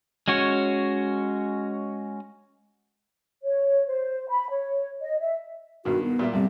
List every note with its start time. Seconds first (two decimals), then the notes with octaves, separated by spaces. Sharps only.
0.28 G#3 C#4 F#4 C#5
3.44 C#5
3.86 C5
4.28 B5
4.50 C#5
5.01 D#5
5.20 E5
5.85 B1 G2 D#3 F#4
6.04 B3
6.19 A#2 G3 E5
6.33 F2 C3 G3